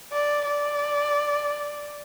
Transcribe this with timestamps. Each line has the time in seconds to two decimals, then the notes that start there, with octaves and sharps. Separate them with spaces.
0.12 D5
0.45 D5